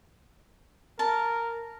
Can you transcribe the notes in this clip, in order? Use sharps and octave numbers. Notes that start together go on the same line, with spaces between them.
A#4 A5